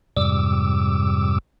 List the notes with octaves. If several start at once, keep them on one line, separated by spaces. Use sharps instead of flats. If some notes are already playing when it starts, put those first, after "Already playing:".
F2 G#2 C3 G3 D6 E6